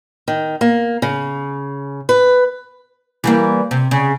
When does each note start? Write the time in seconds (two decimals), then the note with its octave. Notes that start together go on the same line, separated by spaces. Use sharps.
0.28 D#3
0.61 A#3
1.02 C#3
2.09 B4
3.24 E3 G3 A#3
3.71 C3
3.91 C#3